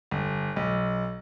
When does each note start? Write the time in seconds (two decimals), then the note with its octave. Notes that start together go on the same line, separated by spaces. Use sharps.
0.11 G1
0.56 B1